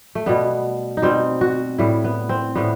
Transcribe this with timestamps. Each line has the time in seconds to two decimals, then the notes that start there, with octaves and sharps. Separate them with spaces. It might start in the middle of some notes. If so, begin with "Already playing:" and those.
0.15 A3
0.26 B2 G3 B3
0.97 D#4
1.02 B2 G3 C4
1.41 F#4
1.78 A2 G3 E4
2.04 B3
2.29 C4
2.55 A2 G3 B3